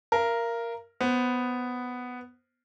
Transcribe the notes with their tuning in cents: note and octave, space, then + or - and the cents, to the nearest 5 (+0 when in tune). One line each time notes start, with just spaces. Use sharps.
A#4 +0 F5 -40
B3 +5 C5 +0